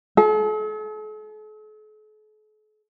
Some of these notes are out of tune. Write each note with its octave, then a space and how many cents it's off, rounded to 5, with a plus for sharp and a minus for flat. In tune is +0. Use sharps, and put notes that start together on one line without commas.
A4 -45